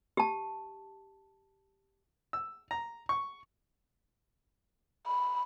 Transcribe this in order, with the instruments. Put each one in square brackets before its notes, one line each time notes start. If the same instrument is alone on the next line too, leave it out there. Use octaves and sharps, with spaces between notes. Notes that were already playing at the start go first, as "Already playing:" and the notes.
[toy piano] G4 A5
[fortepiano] E6
A#5
C#6
[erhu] B5